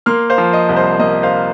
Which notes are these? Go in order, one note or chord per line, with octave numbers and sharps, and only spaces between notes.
A#3 C6 F6
C5 F5
F3
D#5
C2
C5
A#3 D#5
C5 F5